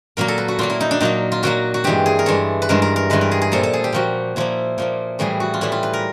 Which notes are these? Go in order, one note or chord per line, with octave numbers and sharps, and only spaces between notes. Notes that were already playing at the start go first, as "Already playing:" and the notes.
A#2 F#3 A#3 A#4
A4
B4
F#4
A#2 F#3 A#3 F4
E4
D#4
D4
A#2 F#3 A#3 D#4
F4
A#2 F#3 A#3 F#4
F#4
G2 E3 G#3 G4
G#4
A#4
G2 E3 G#3 A4
B4
G2 E3 G#3 A#4
A#4
A#4
G2 E3 G#3 B4
A#4
G#4
G#4
A#2 F3 A#3 A4
A4
G#4
G4
A#2 F3 A#3 F#4
A#2 F3 A#3 E4
A#2 F3 A#3
A2 E3 G3 G#4
F#4
F4
A2 E3 G3 E4
F4
B4
A#4